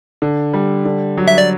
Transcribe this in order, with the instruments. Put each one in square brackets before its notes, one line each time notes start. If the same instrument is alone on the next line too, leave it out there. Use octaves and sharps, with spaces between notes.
[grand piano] D3
G3
D3
F#3
[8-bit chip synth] E5
D5